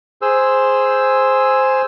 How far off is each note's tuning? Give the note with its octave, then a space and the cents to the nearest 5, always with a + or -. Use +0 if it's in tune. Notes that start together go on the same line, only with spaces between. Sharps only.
G#4 +0 C5 +0 E6 +0